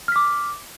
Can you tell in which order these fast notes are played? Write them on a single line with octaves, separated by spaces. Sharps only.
F6 B6 D6